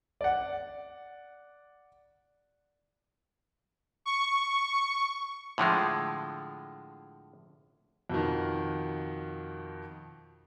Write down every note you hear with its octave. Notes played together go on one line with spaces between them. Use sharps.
D5 F#5
C#6
A2 D3 F3 G#3
F2 B2 D#3